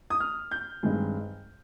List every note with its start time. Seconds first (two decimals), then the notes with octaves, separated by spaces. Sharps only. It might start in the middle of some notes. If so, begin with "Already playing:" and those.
0.10 D#6
0.20 F6
0.51 G6
0.83 G2 D#3 G#3 C4